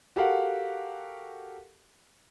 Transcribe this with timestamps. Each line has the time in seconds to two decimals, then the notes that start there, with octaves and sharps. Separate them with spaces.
0.16 F#4 G4 A4 A#4 F5 F#5